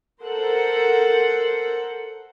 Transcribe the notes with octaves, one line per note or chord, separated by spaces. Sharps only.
A4 A#4 C5 F#5